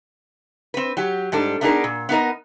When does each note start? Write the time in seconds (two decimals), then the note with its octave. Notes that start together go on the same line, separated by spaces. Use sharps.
0.74 C4 B4
0.97 F#3 G4
1.32 G#2 G3 D4 A4
1.61 A3 B3 D4 D#4 G#4 A#4
1.84 A#2
2.09 B3 D#4 A#4 D#5